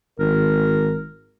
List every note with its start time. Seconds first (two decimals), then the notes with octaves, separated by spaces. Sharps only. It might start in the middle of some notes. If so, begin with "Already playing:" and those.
0.19 G#1 A#4